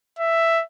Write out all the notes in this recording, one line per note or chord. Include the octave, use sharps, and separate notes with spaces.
E5